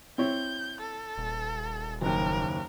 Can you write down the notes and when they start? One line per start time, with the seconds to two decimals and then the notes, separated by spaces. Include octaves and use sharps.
0.18 C4 E4 C#5 G6
0.81 A4
1.18 D#1
2.01 F#1 D#2 A#4